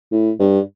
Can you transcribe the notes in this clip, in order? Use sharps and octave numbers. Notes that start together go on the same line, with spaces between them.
A2
G2